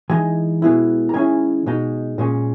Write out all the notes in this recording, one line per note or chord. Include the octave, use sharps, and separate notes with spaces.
E3 G#3 D#4 G#5
B2 G#3 B3 E4
A#5
D#3 G#3 C#4 E4 G#5
B2 G#3 D#4
A#2 G#3 C#4